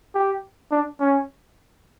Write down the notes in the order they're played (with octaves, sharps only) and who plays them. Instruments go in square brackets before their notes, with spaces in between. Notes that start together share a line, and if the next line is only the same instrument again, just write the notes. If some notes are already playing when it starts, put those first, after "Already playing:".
[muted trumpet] G4
D4
C#4